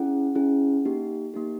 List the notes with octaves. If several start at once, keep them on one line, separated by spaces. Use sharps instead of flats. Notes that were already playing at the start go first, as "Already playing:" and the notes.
Already playing: C#4 E4 G#4 F#5
C#4 E4 G#4
A#3 D#4 G4
A#3 D#4 G4